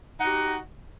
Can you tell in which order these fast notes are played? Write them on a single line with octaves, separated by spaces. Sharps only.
D#4 F#5 F#4 G4